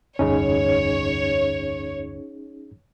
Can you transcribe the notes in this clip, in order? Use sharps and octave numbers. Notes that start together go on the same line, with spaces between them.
F1 D2 G2 C#4 D#4 G#4 C#5